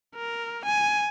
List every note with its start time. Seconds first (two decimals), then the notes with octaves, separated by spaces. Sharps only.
0.16 A#4
0.66 G#5